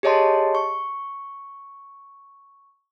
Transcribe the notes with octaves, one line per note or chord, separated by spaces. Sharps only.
G4 G#4 C#5 D#5 A5 C6
C#6